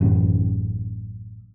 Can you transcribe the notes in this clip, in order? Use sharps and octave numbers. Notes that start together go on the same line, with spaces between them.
A1 F#2